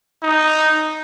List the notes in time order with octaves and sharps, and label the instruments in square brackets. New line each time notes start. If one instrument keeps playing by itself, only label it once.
[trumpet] D#4